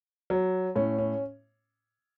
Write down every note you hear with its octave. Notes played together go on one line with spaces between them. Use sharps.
F#3
A2 C#4
C#4